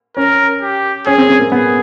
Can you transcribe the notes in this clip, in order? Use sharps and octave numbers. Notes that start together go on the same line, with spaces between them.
C#4 A#4
G4
C#4 G#4
C4
C4
A#3
B3 G#4